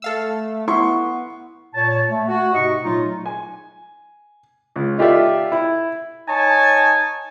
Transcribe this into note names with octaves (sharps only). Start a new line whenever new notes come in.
A3 A4 F5 E6
B3 E4 C6 C#6
A#2 C#5 A5
A3
F#4
G#2 C3 D#4 D#5 C#6
A#2 F#3 A3 D#4 F4
G#5
C#2
D#4 F4 G4 A4 D5 E5
E4
D#4 C#5 G#5 A5